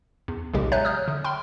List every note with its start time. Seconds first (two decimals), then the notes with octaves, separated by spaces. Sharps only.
0.28 E2
0.54 B1 E2 A#2 C#3 G#3 G4
0.72 C#5 E5 G#5 A#5 F#6 G6
0.85 D#6 F6 G6
1.08 D3
1.24 G5 B5 C6 F6